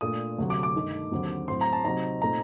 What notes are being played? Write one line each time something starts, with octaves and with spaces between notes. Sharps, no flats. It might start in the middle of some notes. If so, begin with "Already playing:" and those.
A#2 A3 D4 D#6
D2 C3 F#3 A3
D6
D6
G2 D#3 A3 D#4
D#2 D3 F#3 C4
A2 F#3 C4 C6
A#5
A5
C3 F#3 C4 D#4 A#5
A#2 A3 C4 D#4 A#5